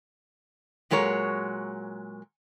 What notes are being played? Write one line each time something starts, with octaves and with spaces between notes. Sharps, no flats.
A#2 F#3 G#3 A#4 C#5